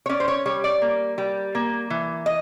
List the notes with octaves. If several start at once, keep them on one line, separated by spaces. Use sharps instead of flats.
C#5
C#4 D5
C5
C#5
G3 C#5
D5
A#3
G3
A#3
E3
D#5